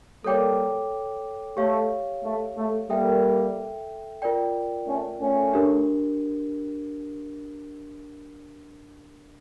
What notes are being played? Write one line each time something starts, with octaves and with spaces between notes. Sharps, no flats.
G3 A#3 A4 C#5 G5 D6
A3 G4 C#5 F5
A3
A3
G3 A#3 A4 E5 G5
F4 A#4 D5 G5
A3 C#4
A3 C#4
D4 G4 A#4